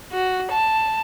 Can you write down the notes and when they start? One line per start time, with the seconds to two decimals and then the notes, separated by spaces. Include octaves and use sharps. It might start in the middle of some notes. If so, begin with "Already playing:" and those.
0.12 F#4
0.51 A5